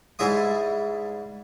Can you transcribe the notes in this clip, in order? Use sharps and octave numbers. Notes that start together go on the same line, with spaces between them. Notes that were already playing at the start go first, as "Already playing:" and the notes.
G#2 G3 E4 G#4 E5 D#6